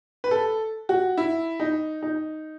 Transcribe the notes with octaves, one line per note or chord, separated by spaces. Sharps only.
B4
A4
F#4
E4
D#4
D#4